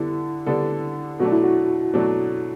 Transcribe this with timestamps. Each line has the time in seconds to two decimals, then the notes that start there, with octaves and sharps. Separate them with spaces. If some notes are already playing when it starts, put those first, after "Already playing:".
Already playing: D3 G3 B3 D4 E4 A4
0.46 D3 G3 B3 D4 A4
1.19 B2 F#3 A3 D4 F#4
1.32 E4
1.44 F#4
1.94 B2 F#3 A3 D4